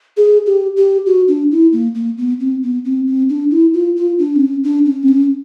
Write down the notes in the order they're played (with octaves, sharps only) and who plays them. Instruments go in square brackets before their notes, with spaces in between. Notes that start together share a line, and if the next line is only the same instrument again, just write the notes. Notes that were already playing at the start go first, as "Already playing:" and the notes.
[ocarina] G#4
G4
G4
F#4
D4
E4
A#3
A#3
B3
C4
B3
C4
C4
D4
E4
F4
F4
D4
C4
C#4
D4
C#4
C4
C#4